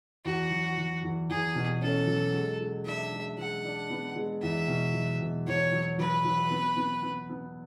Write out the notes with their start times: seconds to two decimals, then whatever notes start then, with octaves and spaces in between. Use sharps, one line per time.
0.25 E2 F#4
0.51 F#3
0.78 F#3
1.03 E2
1.29 E2 G#4
1.55 B2
1.81 C#4 A4
2.07 F#3
2.34 G#3
2.60 G#3
2.85 D4 E5
3.12 G#3
3.38 G#3 F#5
3.65 D4
3.90 B3
4.16 G#3
4.42 E2 E5
4.68 B2
4.94 F#3
5.21 B2
5.47 E2 C#5
5.72 F#3
5.98 F#3 B4
6.25 F#3
6.51 B3
6.77 B3
7.03 B3
7.29 B3